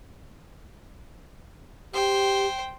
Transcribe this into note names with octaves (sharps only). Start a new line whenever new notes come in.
G4 C5 G5